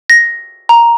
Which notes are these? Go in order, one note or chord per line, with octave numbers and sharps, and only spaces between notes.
A#6
A#5